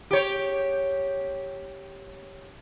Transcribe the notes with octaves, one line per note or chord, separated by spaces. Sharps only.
G4 C#5